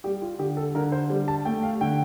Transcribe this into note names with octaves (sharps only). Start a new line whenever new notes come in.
G3 G4
F4
D3 G4
A4
D3 A#4
C5
G3
A5
A3 G5
F5
D3 G5